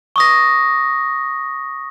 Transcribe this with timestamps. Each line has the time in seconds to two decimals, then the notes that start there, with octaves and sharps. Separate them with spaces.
0.16 C#6 D#6 A#6